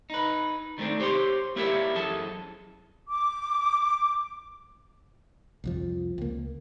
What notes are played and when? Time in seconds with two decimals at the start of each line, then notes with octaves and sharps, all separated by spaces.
0.10 D#4 B4
0.78 D#3 G3 A3 C4 D4
1.00 G4 C5 C#5 F#5 C6
1.56 A#3 E4 G4 A#4 C#5 E5
1.95 F#2 E3 G#4 A4 A5
3.09 D6
5.64 C2 F2 F3
6.18 C#2 A#3